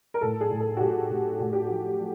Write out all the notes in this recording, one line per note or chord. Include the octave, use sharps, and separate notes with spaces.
A#4
A2 A4
G#4
A2
A4
F#4
A2 G4
A2
A2 F#4
G4
F3 F#4
F3